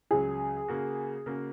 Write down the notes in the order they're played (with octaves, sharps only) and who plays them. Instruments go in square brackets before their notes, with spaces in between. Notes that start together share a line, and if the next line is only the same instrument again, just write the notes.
[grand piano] C#2 C#3 F#3 [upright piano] G#4
[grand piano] C#3 A#3 F#4
C#3 A#3 F#4